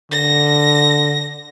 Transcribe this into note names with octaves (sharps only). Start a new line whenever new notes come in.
D3 A#6